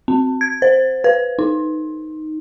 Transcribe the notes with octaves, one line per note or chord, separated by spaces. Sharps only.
C4
G#6
C5
B4
D#4